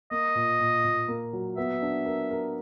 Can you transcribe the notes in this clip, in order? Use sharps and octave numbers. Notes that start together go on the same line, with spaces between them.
A#3 D#5
A#2
A#2
A#2
A#3
F#3
B3 E5
D4
A#4
A#4